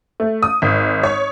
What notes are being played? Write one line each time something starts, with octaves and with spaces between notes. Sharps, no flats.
A3
D#6
G#1
C#5